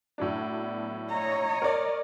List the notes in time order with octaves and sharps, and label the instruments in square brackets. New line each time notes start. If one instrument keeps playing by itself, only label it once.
[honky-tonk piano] A2 F#3 D4
[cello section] B3
[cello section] C#5 D#5 [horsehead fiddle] A#5
[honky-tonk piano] A#4 D5